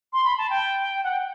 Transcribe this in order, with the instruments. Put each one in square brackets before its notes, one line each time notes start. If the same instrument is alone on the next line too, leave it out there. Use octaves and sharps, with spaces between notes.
[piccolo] C6
B5
A5
G5
F#5
G5